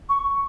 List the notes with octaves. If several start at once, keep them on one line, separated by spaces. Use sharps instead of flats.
C#6